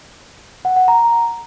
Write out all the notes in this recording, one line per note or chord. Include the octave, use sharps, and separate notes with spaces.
F#5
F#5
A#5